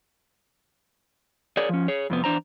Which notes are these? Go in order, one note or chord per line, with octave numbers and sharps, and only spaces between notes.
G#4 A#4 C#5 D5
F3 C#4
G#4 C#5
F2 C3 B3
E2 D4 C5 A#5